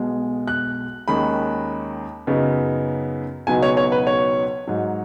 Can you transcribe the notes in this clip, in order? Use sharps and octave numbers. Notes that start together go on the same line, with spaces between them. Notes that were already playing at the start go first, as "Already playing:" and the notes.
Already playing: B1 B2 G#3
F#6
D#2 D#3 G#3 C#4 B5
F#2 C#3 B3 D#4
C#2 B2 F#3 B3 D#4 G#5
C#5
C#5
B4
C#5
G#2 F#3 D#4